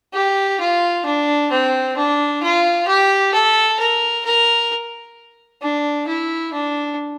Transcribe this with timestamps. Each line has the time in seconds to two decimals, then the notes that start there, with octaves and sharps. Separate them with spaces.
0.14 G4
0.60 F4
1.05 D4
1.51 C4
1.97 D4
2.43 F4
2.87 G4
3.33 A4
3.80 A#4
4.25 A#4
5.62 D4
6.08 E4
6.53 D4